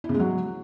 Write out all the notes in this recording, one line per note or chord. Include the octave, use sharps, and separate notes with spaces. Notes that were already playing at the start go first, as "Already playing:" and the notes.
E4
C#3
G#3
F#3